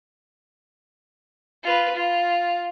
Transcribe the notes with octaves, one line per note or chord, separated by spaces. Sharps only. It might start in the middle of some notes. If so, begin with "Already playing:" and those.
F4 B4
F4